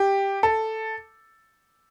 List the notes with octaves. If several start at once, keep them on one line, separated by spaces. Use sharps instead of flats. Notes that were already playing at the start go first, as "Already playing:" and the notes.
Already playing: G4
A4